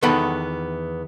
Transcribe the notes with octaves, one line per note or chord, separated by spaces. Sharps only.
E2 D#3 B3 A4 F#5 B5